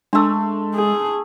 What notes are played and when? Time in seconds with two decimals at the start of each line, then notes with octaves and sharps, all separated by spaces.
0.13 G#3 A3 D4 C6 E6
0.74 G#4